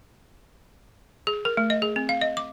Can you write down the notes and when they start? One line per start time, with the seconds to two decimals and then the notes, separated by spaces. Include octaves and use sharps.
1.27 G#4
1.45 A#4
1.57 A3
1.70 D#5
1.82 G#4
1.96 C4
2.09 F5
2.21 D#5
2.37 D6